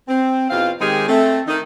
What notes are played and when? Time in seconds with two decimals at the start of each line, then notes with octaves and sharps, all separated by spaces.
0.08 C4
0.50 E2 B2 C4 F4 F5
0.80 D#3 G#3 C4 D#4 G4 G#4
1.07 A3 C4
1.47 D#3 D#4